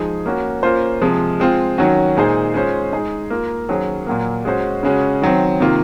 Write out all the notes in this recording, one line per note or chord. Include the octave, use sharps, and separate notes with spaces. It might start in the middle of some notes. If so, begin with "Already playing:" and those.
Already playing: F3 G#3 D#4 G#4
A#3 C#4 F#4
A#3 C#4 F4 C5
C3 F3 G#3
G#3 C4 F4
D#3 F#3 C#4 F#4
A#2 G#3 D#4 G#4 C5
G#3 C#4 F4 C5
G#3 D#4 G#4
A#3 F4 A#4
D#3 F#3 C#4 G#4 C5
A#2 F#3 A#3
G#3 C#4 F#4 C5
C#3 G#3 C#4 F#4
D#3 F#3 C4
C3 D#3 A#3 F4